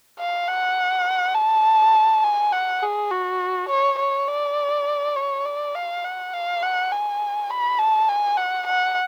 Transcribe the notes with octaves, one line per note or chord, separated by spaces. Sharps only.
F5
F#5
A5
G#5
F#5
G#4
F#4
C#5
C#5
D5
C#5
D5
F5
F#5
F5
F#5
G#5
B5
A5
G#5
F#5
F#5